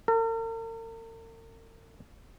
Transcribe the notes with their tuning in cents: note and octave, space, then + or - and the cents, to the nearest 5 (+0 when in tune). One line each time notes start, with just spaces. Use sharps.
A#4 -45